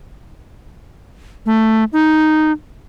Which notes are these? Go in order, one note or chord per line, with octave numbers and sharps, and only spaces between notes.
A3
D#4